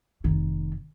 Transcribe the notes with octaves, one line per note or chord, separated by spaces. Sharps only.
F1 D#3